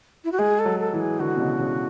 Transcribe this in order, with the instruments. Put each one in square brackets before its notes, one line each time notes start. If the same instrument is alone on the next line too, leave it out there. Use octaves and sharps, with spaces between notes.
[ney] E4
F#4
[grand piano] G#3 [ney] G#4
[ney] A4
[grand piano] F#3
[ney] A4
[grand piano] E3
[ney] G#4
[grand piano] D3 [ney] F#4
[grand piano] B2
C#3
C#3